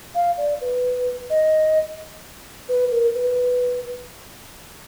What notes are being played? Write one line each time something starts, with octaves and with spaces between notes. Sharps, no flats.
F5
D5
B4
D#5
B4
A#4
B4